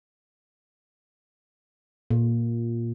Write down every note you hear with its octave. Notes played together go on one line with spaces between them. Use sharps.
A#2